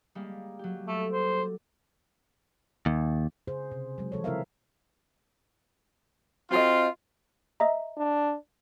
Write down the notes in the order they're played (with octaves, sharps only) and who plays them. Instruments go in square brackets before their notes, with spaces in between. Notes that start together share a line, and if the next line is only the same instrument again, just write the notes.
[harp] G3 G#3 A#3
F#3 G4
[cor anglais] A3 [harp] A4 D6
[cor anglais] C5
[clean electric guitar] D#2
[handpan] C#3 G#4 C5
C3
F#3 G#3
E3 F3 A4 C#5
C#3 C4 E4 A#4 E5 F5
[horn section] C4 F4 [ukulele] F#4 A4 D#5
[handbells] D#5 E5 A#5
[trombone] D4